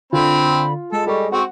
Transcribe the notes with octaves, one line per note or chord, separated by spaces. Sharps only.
D3 C4 F4 B5
G#3 A4
G3 A4 D#5 C#6
C4 F#4 F#5 C#6